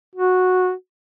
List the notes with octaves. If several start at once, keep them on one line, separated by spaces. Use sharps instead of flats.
F#4